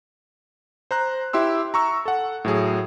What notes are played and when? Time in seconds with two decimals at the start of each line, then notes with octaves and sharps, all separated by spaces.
0.91 C5 A#5 F#6
1.33 E4 G4 C6 E6
1.74 A#5 C#6 E6
2.06 A4 F#5
2.45 A2 F#3 G#4